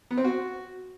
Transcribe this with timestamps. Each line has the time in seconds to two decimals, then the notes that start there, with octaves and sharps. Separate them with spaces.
0.11 B3
0.17 C4
0.24 F#4